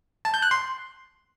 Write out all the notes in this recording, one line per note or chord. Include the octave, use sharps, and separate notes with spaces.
A5
G6
F#6
C6